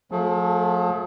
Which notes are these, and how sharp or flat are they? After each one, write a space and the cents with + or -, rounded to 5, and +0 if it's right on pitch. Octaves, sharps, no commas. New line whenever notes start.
F3 +40 A3 +15 G#4 +45